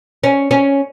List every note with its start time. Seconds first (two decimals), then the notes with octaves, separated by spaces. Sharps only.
0.24 C#4
0.51 C#4